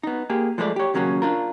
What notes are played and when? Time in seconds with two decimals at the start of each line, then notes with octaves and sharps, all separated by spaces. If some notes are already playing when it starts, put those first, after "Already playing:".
0.03 B3 D#4
0.30 A#3 G4 G#4
0.58 F3 G#3 A3 B4 D5
0.76 G4 C#5
0.94 D#2 C#3 F#3 A#3 C4 C#4
1.22 D4 F4 A#4